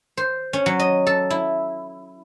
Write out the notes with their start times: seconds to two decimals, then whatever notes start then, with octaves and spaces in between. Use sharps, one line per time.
0.17 C5
0.53 C#4
0.66 F#3
0.79 D#5
1.07 A4
1.30 E4